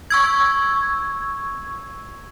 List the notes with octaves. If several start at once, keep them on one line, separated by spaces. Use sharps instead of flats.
C#6 E6 G#6